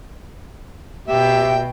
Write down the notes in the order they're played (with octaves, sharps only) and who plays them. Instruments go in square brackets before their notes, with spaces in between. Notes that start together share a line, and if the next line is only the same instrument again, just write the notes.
[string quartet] B2 G5 [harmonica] G4 E5